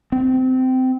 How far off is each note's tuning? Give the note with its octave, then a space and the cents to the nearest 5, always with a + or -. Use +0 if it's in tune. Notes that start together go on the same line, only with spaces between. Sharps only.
C4 -20